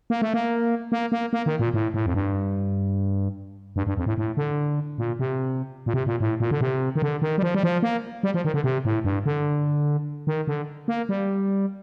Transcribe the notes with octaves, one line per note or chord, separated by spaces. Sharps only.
A#3
A3
A#3
A#3
A#3
A#3
D#3
A#2
A2
A2
F2
G2
G2
G2
F2
A2
A2
D3
A#2
C3
A#2
C3
A#2
A2
A#2
D3
C3
D#3
D3
D#3
G3
F3
G3
F3
A#3
G3
F3
D#3
D3
C3
A2
G2
D3
D#3
D3
A#3
G3